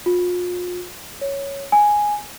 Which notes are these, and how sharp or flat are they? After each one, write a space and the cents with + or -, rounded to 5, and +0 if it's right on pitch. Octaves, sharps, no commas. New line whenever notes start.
F4 +35
C#5 +0
G#5 +0